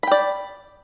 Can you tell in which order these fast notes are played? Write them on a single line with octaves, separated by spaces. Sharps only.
B5 G5 D5